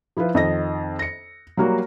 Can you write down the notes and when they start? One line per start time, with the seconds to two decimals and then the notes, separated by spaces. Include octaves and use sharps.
0.17 F3 E4 F4 B4
0.35 F2 D#3 D#5 A#6
0.99 A#6 C#7
1.57 F#3 G3 A#3 F#4